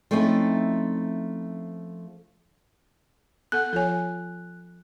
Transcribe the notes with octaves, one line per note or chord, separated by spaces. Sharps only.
F3 A3 C4 C#4 D#4 E4
B3 A4 F#5 F#6
F3 F4 A4 C#5 G#5